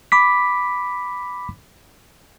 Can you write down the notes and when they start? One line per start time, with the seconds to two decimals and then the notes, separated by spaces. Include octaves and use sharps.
0.12 B5 D6 B6